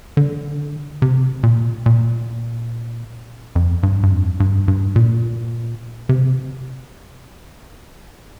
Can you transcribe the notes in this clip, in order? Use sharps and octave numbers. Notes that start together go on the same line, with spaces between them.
D3
C3
A#2
A#2
F2
G2
G2
F2
G2
G2
A#2
C3